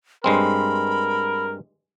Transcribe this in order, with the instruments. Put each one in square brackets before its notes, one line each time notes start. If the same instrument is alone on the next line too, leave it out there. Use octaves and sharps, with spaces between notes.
[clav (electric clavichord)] G2 G#3 C4 [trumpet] A#4 [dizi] B5